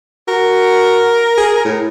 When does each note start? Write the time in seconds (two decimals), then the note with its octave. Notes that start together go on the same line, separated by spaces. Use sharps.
0.28 F#4 A#4
1.38 G#4
1.65 A2